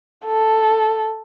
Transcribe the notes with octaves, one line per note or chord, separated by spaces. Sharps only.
A4